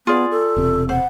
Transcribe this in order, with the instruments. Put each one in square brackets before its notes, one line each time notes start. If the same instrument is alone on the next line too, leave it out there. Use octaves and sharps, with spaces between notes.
[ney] B3 [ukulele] F4 G#4 D5
[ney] A4
[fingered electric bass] E1 C3
[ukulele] C5 [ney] F#5